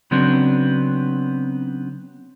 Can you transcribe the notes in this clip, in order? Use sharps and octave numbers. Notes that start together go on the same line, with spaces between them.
C#3 F#3 B3 C4 D4